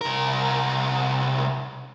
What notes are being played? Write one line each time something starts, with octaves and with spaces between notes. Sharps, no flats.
C2 A#4